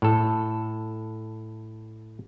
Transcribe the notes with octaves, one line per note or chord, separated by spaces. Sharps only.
A2 A4